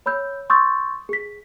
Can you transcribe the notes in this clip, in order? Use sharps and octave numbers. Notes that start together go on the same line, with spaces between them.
C#5 B5 E6 G6
C6 C#6 D#6 E6 G6 A6
G#4 B6